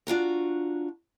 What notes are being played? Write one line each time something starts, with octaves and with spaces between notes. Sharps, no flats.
D4 F4 F#4 A#5